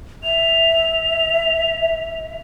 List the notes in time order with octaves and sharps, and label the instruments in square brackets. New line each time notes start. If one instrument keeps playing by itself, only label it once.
[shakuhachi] E5 [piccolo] F7